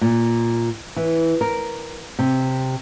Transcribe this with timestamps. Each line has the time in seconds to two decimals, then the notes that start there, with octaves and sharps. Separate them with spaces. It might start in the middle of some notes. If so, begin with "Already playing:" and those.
0.01 A#2
0.97 E3
1.41 A#4
2.19 C3